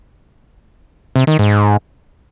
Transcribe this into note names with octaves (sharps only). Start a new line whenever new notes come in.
C3
D#3
G#2